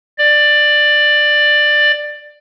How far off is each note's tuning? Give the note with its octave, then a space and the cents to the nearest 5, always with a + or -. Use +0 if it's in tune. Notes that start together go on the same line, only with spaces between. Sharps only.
D5 +15